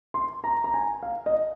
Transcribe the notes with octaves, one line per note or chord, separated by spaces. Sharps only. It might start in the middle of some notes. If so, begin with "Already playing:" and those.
C6
A#5
A#5
G#5
F5
D#5